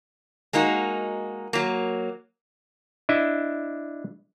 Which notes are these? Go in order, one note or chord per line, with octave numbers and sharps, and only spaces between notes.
G#3 A#3 D#4 F#4
F#3 A#3
D4 E4 D#5 E5